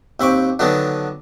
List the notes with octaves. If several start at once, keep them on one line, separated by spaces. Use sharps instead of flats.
D#2 C4 B5 C#6 D6
D3 D#3 F#3 B3 D4 D#4